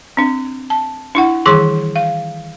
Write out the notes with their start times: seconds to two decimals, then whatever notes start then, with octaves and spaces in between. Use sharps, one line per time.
0.17 C4 D4
0.70 A5
1.15 D4 E4 F#5
1.46 D#3 E3 G3 G#4 C6
1.96 F5